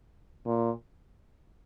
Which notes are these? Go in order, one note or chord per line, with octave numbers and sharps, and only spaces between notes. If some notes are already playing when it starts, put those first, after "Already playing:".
A#2